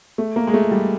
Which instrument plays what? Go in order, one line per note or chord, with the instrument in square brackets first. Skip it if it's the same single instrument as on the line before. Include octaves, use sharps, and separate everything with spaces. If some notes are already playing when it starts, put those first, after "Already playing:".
[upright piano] A3
A#3
G#3
A3
G3